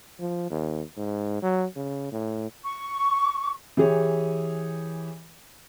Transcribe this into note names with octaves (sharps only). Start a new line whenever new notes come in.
F3
D#2
G#2
F#3
C#3
A2
C#6
E3 G4 G#4 C#5